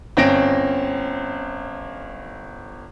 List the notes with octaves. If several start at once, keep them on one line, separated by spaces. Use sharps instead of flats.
G1 C4 C#4 A#6 D7